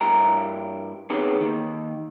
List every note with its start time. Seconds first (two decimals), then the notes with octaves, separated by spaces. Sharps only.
0.01 G2 E4 G4 A#4 A#5
1.10 B3 C4 D#4 G4 G#4 C#5
1.41 D#2 D#3